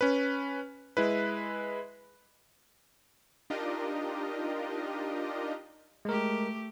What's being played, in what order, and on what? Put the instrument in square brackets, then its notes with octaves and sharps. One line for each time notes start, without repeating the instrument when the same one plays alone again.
[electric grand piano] C#4 B4
G#3 E4 B4
[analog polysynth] D4 D#4 F4 G4 A#4 D#5
[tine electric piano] G#3 A#4 [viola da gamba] A3 G4